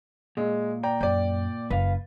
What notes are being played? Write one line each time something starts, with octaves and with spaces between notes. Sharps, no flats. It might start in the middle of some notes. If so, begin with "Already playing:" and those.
A#2 G#3
D5 G5 A#5
F#2 D5 G5
F#1 B4 F5